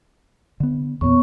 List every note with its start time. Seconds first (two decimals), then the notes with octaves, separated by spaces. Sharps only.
0.60 D3 B3
1.01 E2 A#2 B3 C#5 C#6